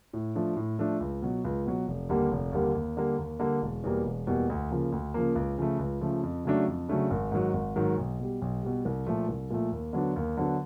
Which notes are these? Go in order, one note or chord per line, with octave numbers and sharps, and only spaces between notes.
A2
F3 A3 D4
A2
F3 A3 D4
C#2
B2 F#3
C#2
B2 F#3
F1
D#2 D3 G3 A#3
F1
D#2 D3 G3 A#3
D#2
D3 G3 A#3
D#2
D3 G3 A#3
E1
E2 B2 G3 A#3
E1
E2 B2 G3 A#3
D2
C#3 F3 A#3
D2
C#3 F3 A#3
C#2
C#3 F3 A3
C#2
C#3 F3 A3
F2
C#3 F#3 A3 D4
F2
C#3 F#3 A3 D4
G#1
G#2 D#3 F#3
G#1
G#2 D#3 F#3
B1
B2 G3
B1
B2 G3
C2
A#2 F3 A3
C2
A#2 F3 A3
D#2
D3 F#3 B3 D4
D#2
D3 F#3 B3 D4